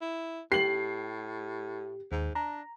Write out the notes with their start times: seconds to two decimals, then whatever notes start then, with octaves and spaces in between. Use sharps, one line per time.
0.01 E4
0.52 A2 G4 C7 F#7
2.12 D#2 G#2
2.35 D4 A#5